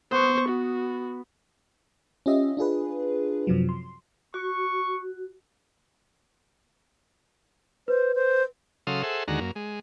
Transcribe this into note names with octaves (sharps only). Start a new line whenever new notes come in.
B3 C5 C#6
F#4
C#4 F4 G4 D#5 E5
D4 F4 G#4 B4
F#2 C3 F3 F#3
C6
F#4 C#6
B4 C5
C5
C#3 F#3 A4 F5 C6 D#6
G#4 A4 C5 E5 F#5
D#2 D3 G#3 F#4 A#5
F#2 A#3
G#3